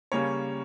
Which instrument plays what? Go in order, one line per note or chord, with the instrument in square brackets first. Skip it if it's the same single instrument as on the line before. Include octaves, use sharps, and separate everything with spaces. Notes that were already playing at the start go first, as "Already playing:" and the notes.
[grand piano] C#3 G3 A#3 C#4 C#5